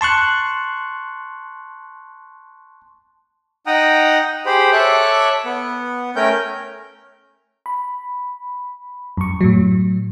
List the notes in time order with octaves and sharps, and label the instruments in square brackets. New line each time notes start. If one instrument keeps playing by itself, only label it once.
[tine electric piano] A5 C6 C#6 F#6
[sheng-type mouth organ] D#4 F#5 G5 A#5 D#6
G4 G#4 C5 G5 B5
A4 C#5 E5 D6 F#6
B3
A3 C#4 A#4 G5 G6
[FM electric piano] B5
F#2 C#6
A2 F#3